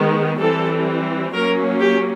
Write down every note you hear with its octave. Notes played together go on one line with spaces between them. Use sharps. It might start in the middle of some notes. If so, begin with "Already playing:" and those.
Already playing: D#3 G#3 B3
E3 G3 C4 A4
F#3 A#3 C#4 A#4
G4